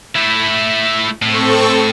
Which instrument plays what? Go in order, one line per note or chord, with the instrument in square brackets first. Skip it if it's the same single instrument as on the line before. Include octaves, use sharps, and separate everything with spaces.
[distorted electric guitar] A3 E4
[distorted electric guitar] A2 [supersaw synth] C4 A4 C#6